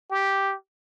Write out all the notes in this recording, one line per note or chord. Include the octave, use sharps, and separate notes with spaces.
G4